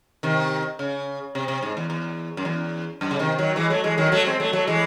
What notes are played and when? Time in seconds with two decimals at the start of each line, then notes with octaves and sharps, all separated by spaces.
0.23 C3 D#3
0.79 C#3
1.35 C3
1.48 C3
1.63 G#2
1.77 E2
1.90 E2
2.37 F#2
2.45 E2
3.01 F#2
3.11 C#3
3.19 C3 D#3
3.38 D#3 F#3
3.56 E3 G#3
3.70 F#3 A3
3.84 E3 G#3
3.98 D#3 F#3
4.12 F#3 A3
4.25 G#3 C4
4.40 F#3 A3
4.53 F#3 A3
4.67 E3 G#3